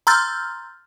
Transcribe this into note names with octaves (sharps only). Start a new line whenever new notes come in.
A#5 C6 E6 F6 G6 A6